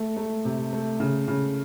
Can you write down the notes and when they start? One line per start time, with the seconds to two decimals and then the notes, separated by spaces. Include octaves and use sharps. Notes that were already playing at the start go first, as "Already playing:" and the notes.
Already playing: A3
0.17 A3
0.45 C3
0.73 A3
1.00 C#3
1.28 C#3